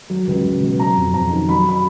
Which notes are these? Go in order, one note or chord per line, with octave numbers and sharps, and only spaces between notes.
F#3
C#2
C#2
B2
F#3 A#5
F2
F2 A#5
D#3
F#3 B5
B5